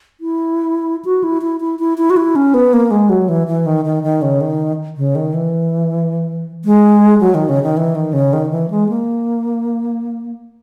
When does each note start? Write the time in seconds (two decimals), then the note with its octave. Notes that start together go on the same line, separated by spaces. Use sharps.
0.21 E4
1.05 F#4
1.24 E4
1.42 E4
1.61 E4
1.79 E4
1.98 E4
2.10 F#4
2.17 E4
2.36 C#4
2.54 B3
2.73 A#3
2.91 G#3
3.09 F#3
3.29 E3
3.47 E3
3.66 D#3
3.85 D#3
4.03 D#3
4.22 C#3
4.41 D#3
4.97 C#3
5.15 D#3
5.34 E3
6.65 G#3
7.20 F#3
7.35 D#3
7.49 C#3
7.63 D#3
7.77 E3
7.95 D#3
8.13 C#3
8.33 D#3
8.51 E3
8.70 G#3
8.89 A#3